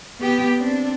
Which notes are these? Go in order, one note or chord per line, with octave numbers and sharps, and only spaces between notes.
B3 G4
C4 D4